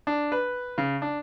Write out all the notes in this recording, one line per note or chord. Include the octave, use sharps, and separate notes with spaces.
D4
B4
C#3
D4